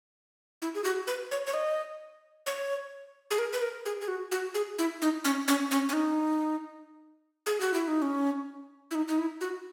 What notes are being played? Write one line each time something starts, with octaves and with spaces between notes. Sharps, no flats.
E4
G#4
F#4
B4
C#5
C#5
D#5
C#5
G#4
A#4
B4
A#4
G#4
G#4
F#4
F#4
G#4
E4
D#4
C#4
C#4
C#4
C#4
D#4
G#4
F#4
E4
D#4
C#4
E4
D#4
D#4
E4
F#4